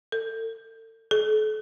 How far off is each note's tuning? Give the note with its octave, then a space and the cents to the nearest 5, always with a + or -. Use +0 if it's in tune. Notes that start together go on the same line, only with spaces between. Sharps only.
A4 +35
A4 -40